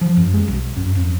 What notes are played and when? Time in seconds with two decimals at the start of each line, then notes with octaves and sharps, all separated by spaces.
0.01 F3
0.17 F#2
0.34 G#3
0.48 B1
0.76 F#2
0.95 F2